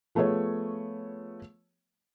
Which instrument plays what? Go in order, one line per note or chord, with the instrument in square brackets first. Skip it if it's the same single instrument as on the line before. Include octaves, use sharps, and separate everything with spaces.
[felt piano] F3 A3 B3 G#4 C#5